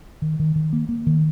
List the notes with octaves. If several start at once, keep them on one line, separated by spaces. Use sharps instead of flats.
D#3
D#3
D#3
A#3
A#3
D#3